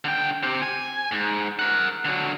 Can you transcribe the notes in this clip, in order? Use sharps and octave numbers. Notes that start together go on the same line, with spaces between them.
D3 G5
C4 G4
G#5
G#2
A#4 F#5
D3 F#3